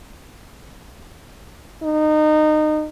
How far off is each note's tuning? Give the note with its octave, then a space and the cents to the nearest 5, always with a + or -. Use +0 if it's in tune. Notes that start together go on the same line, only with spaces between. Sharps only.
D#4 -25